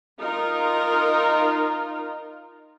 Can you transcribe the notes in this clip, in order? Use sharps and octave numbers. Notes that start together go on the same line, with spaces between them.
D#4 F4 A#4